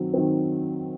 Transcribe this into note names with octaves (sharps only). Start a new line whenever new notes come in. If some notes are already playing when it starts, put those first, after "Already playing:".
Already playing: D#3 F#3 C4
D#3 F#3 C4